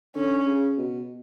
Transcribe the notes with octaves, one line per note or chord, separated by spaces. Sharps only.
D3 C#4
C#3
B2